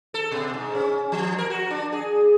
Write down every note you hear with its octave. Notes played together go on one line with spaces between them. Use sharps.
A4
B2
G#2
C#4
F3
A#4
F#4
D4
G#4